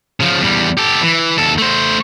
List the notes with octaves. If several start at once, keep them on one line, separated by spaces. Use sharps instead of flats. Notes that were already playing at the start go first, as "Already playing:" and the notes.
C#3 F3
E2 G3
G4 A4
E3
D#2 A4
A3 C5